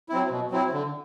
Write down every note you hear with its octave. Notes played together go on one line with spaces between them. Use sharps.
F#3 C4 E4
B2
F#3 C4 E4
D3